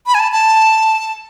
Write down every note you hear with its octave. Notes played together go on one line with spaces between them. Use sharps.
B5
G#5
A5
A5